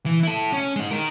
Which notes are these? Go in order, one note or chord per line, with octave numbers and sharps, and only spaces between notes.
E3
E4 A4
C#4
G#3 D#4
D#4 A#4